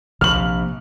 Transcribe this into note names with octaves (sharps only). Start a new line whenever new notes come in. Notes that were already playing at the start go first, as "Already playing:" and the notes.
A#1 C3 F6 F#7